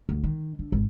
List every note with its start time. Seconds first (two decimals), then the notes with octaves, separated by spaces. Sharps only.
0.09 D2
0.24 D#3
0.59 D3
0.72 G#1